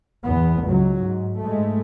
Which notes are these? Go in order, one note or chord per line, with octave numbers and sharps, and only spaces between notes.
E2 B3
C#2 F#3
G#2
G#2 G#3 A3